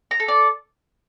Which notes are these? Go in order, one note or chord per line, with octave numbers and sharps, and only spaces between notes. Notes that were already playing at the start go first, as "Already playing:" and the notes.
A#5
A4
D5